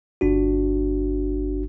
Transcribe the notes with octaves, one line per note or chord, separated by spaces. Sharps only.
G1 D4 F#4